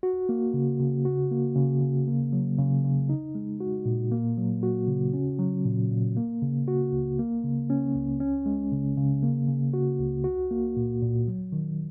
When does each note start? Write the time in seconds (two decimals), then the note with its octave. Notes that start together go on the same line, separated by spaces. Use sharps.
0.03 F#4
0.29 A#3
0.54 C#3
0.80 C#3
1.05 F#4
1.31 A#3
1.56 C#3
1.81 C#3
2.08 A#3
2.33 F#3
2.58 C#3
2.84 C#3
3.09 D#4
3.35 G#3
3.60 F#4
3.85 A#2
4.12 A#3
4.37 F#3
4.63 F#4
4.88 C#3
5.13 C#4
5.39 F#3
5.65 A#2
5.91 A#2
6.17 A#3
6.42 C#3
6.68 F#4
6.92 C#2
7.19 A#3
7.44 C#3
7.70 C#4
7.95 C#2
8.20 C#4
8.46 G#3
8.72 C#3
8.97 C#3
9.23 A#3
9.48 C#3
9.73 F#4
10.00 C#2
10.24 F#4
10.51 A#3
10.76 A#2
11.02 A#2
11.28 F#3
11.52 D#3